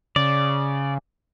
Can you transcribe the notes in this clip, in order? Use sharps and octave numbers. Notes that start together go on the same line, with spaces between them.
C#3 D5